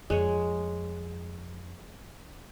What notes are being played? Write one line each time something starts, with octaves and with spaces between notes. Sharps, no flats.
F2 G#3 C#5